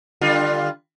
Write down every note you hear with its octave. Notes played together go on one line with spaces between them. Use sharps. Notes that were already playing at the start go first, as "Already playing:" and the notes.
D3 G3 F4